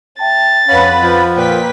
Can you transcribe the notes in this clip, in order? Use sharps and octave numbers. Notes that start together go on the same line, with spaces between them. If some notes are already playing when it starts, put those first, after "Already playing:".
E5 G5 A5 A6
F2 C#4 B4 F5 F#5 B5
F3
A#2 B4 G5 B6